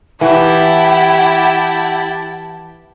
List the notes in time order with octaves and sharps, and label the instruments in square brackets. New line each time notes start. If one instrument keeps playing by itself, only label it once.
[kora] E3 [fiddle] E4 G4 [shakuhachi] F#5 [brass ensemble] A5